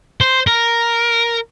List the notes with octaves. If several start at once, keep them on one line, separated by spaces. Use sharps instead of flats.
C5
A#4